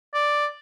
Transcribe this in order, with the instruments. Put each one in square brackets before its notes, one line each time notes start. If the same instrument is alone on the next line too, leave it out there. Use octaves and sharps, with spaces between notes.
[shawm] D5